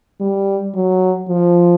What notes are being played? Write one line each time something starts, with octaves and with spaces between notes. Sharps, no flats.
G3
F#3
F3